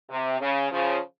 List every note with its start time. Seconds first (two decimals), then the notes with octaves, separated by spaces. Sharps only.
0.10 C3
0.41 C#3
0.72 C#3 F3